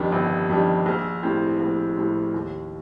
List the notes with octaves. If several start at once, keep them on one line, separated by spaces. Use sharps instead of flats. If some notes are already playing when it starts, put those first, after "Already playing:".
Already playing: G1 F2 D#3 G3 D4
G1
F2 D#3 G3 D4
A#1
A2 G3 C4
A#1
A2 G3 C4
D#2